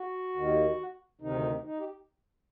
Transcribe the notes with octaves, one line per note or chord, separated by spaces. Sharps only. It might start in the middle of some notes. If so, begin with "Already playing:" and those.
Already playing: F#4
D#2 D#3
D2 C3 D#3 D#4
D#4
G4